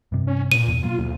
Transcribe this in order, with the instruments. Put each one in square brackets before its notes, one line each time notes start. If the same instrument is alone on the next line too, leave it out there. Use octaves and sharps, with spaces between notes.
[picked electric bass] G2 C3
[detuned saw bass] C#4
[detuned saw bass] A#2 [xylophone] D#7
[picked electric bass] E2 B2
[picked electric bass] B2 F#3 A#3 [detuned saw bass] F4
[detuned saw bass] D2